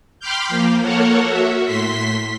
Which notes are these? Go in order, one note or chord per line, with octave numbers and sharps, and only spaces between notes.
G5 B5 C6 D6 F6 G6
F3 A#3
A#3 A4 A#4 C#5 F#5
F#4 E5
A2 C6 B6